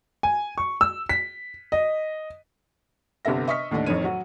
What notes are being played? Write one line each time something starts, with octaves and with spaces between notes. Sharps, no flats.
G#5
C#6
E6
B6
D#5
G1 C3 B3 A4 E5 A#6
D#5 E5 C#6 D#6 F6 B6
D#2 A2 D3 D4 D#5
F2 A2 D#3 A3 C#5 D#7
F#3 F#4